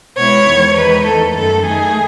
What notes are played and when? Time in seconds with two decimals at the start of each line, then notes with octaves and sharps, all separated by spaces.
0.17 B2 G#3 B3 E4 C#5
0.47 E2 D#3 G#3
0.76 E2 D#3 G#3 D#4 B4
1.06 E2 D#3 A3 A4
1.35 F#2 D#3 A3 A4
1.64 D#3 A3 D#4 G#4